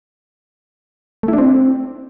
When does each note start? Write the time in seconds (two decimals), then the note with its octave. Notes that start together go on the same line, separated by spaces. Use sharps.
1.23 A3
1.28 E4
1.33 D4
1.38 C4